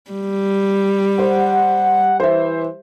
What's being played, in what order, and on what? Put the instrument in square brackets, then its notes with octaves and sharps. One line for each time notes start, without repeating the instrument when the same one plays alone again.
[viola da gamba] G3
[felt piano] C5 [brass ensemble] F#5
[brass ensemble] E3 [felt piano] C5 E5